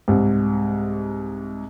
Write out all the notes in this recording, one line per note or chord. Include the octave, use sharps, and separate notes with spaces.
C2 G#2